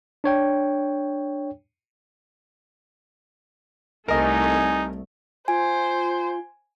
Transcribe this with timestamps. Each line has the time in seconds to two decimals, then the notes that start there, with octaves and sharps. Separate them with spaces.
0.24 D4 C#5 G5
4.08 C2 A3 D#4 A#4 D#5 G#5
5.48 F4 C5 G#5